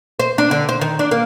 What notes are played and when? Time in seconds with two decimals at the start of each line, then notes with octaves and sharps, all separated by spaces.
0.19 C5
0.38 D4
0.51 D3
0.69 C5
0.81 D#3
0.99 D4
1.11 A#3